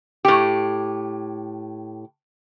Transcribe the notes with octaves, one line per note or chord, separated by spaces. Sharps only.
A2 G4